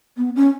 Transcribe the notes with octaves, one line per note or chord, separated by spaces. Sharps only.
B3
C#4